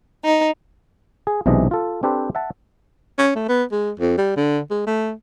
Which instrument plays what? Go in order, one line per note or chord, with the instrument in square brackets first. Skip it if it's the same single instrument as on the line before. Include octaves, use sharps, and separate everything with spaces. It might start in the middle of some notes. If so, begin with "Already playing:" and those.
[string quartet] D#4
[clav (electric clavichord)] G#4
B1 C3 E3 G#3 D4 D#5
F4 A4
C4 D4 G4 A4 B4 C5
E5 F#5 A5
[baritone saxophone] C#4
A3
B3
G#3
F2
G3
D3
G#3
A3